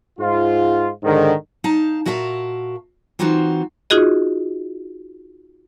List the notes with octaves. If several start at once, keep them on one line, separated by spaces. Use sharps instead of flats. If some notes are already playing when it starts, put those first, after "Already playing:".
G#2 F4
G#2 D3 D#3
D#4 F5 A5
A#2 F#4 A#4 E5 F5 A5
E3 C4 D#4 F4 F#4 C5
D#4 F4 F#4 G#4 D#5